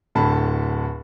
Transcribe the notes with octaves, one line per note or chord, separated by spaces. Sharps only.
D1 A2 D3 A5 B5